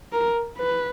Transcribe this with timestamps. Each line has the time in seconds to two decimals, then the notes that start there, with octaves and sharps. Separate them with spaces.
0.12 A#4
0.58 B4